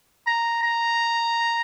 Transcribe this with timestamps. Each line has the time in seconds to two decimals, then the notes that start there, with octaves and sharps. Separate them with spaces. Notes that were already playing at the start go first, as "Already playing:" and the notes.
0.27 A#5
0.63 A#5